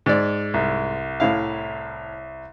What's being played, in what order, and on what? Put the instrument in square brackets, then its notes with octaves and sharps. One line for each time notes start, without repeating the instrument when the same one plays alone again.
[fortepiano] G#2 D5
[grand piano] C2
[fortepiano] A2 E4 F5